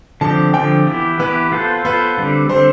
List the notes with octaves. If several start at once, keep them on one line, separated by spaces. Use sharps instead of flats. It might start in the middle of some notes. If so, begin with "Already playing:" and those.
D3 F3 C4 G4 A5
D3 F3 C4 G4 G5
E3 B3 E4 G4
E3 B3 E4 G4 B4
B3 F4 A4 C5
B3 F4 A4 B4 C5
D3 G3 C4
D3 G3 C4 C5